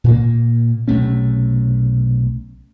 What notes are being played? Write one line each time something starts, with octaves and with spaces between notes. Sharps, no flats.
A#2 A#3
B1 C3 A3 C#4